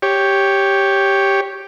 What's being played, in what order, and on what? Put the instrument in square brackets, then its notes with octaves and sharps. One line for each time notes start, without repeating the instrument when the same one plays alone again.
[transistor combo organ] G4 C#5